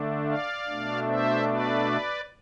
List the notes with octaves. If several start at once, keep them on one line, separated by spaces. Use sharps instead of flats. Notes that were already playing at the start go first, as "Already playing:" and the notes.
Already playing: D3 A3 D4
D5 F5
B2 A3 D4
C5 E5
B4 D5